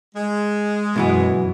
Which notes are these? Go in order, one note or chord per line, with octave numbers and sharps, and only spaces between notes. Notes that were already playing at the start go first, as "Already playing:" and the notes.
G#3
F#2 B2 E3 B3